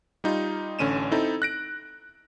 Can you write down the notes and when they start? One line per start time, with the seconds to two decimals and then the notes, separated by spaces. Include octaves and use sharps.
0.24 G3 D#4 F4
0.79 A1 D3 C#4 D#7 E7
1.12 C4 D#4 E4 A4
1.42 F#6 A#6 D7